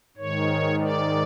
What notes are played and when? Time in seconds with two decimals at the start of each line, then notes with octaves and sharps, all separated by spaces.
0.17 G#2 D#3 C#5
0.81 D5